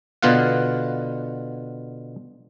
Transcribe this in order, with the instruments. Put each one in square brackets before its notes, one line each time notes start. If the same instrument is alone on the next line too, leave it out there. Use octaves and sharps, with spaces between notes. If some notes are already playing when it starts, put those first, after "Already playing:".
[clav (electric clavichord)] B2 D3 B3 F4 F5 F#5